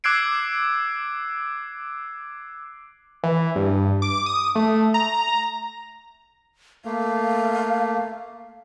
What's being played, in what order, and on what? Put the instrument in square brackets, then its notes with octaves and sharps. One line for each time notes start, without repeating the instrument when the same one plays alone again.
[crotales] D6 E6 F#6 G#6 C7 D7
[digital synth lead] E3
G2
D6
D#6
A3
A#5
[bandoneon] A3 A#3 [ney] F5